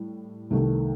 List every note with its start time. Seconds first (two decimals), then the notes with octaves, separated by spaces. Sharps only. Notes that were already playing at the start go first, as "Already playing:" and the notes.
Already playing: A2 G3
0.51 C2 C3 D#3 A3